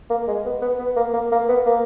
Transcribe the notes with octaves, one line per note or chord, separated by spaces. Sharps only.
A#3
G#3
B3
B3
B3
A#3
A#3
A#3
B3
A#3